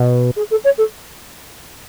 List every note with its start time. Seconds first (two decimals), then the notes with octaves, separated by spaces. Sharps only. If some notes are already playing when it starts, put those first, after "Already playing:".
Already playing: B2
0.36 G#4
0.51 A4
0.64 C#5
0.78 A4